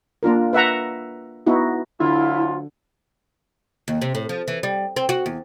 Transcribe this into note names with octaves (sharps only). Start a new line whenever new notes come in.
A#3 D4 F4 A#4
B4 E5 F#5 A#5
B3 D#4 E4 F#4
D2 D3 F#3 E4 F4
D#2
C3
A2
F3
E3
G3
C4
F#4
E2